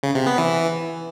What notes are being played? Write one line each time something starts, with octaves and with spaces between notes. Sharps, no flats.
C#3
C3
B3
E3